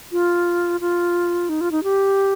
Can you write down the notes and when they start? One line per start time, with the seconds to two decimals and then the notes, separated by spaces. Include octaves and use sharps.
0.12 F4
0.81 F4
1.49 D#4
1.61 F4
1.72 D#4
1.83 G4